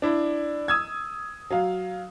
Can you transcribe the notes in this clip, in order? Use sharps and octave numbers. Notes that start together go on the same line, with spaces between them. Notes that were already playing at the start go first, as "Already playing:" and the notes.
D4 E4
D#6 E6 G#6
F#3 F5